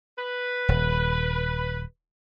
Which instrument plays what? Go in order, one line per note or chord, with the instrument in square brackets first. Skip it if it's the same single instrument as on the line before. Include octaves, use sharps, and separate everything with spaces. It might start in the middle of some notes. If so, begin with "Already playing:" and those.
[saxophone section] B4
[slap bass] D#1